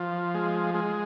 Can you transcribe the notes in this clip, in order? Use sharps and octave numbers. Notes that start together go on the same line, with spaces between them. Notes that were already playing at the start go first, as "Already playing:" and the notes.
Already playing: F3
G#3
G#3